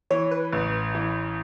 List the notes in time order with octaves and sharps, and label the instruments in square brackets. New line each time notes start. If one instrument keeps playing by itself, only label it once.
[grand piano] E3 [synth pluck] C#5
[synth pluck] B4
[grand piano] A1
E3